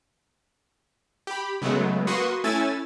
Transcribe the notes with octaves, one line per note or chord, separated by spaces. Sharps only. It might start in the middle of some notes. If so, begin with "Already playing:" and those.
G4 B5
C#3 F#3 G#3 A3 B3
A#3 F#4 B4 C6 C#6 D#6
A3 C#4 E4 G#5 E6 A6